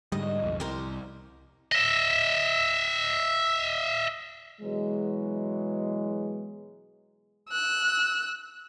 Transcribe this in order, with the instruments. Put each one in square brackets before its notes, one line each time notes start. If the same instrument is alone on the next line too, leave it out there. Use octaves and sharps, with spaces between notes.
[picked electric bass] G#2 D3 G3 [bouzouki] D#5
[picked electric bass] B1 F2
[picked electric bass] C2 [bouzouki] G4 A#4 C5
[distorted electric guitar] D#5 E5
[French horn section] B2 E3 F#3 G#3
[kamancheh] E6 F#6